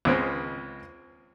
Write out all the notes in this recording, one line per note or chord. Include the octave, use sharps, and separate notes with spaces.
C#2 C#3 G#3 C4